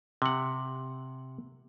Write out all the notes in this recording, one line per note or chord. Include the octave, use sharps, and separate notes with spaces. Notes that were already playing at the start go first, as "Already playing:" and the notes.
C3 F#5